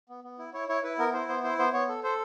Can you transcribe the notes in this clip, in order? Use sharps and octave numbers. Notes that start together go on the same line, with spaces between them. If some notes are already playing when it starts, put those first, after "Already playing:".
B3
B3
E4
E4 C#5
E4 C#5
E4 B4
B3 A#4
E4 C5
B3 C5
E4 C5
B3 C5
B3 C#5
A4
A4 C5